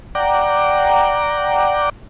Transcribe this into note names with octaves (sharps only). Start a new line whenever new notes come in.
D5 F#5 G5 A#5 D6